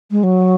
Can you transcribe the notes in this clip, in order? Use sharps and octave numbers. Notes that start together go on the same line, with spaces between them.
G#3
F#3